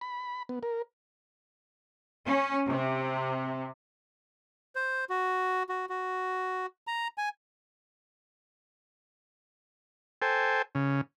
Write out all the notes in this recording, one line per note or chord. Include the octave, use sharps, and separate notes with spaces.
B5
B3
A#4
C#4
C3
C5
F#4
F#4
F#4
A#5
G#5
A4 C5 G5 G#5
C#3